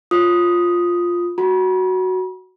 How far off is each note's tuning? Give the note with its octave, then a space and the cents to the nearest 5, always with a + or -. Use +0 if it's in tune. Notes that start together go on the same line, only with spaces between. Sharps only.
F4 +0 D#6 +0
F#4 +5 B5 -45